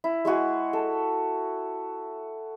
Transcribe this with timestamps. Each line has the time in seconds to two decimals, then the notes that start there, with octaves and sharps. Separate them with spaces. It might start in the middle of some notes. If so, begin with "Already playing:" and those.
0.04 E4
0.25 G#3 E4 F#4 G#4
0.73 A4